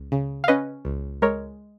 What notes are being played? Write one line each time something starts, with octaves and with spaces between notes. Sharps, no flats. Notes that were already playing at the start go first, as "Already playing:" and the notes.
Already playing: C#2
C#3
F5
C#4 B4 D#5
C#2
G#3 A#4 C#5